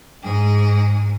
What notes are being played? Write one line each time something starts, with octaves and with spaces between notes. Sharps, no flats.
G#2 G#4